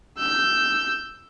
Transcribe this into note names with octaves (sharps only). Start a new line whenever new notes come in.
E6 G6